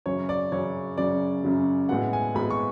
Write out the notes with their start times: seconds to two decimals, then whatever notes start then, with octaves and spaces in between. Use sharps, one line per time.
0.06 F#2 C#3 F#3 C#5
0.29 D5
0.52 F#2 C#3 F#3 C#5
0.98 F#2 C#3 F#3 D5
1.44 F#2 C#3 F#3
1.89 A2 G#3 B3 F#5
2.13 G#5
2.35 A2 G#3 B3 B5
2.50 C#6